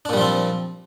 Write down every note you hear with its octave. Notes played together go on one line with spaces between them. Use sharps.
A#2 F3 G3 C4 D4